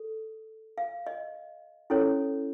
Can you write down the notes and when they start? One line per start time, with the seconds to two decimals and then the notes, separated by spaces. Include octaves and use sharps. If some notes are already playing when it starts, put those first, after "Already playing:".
Already playing: A4
0.78 F5
1.07 D#5
1.90 C#4 E4 A4 C#5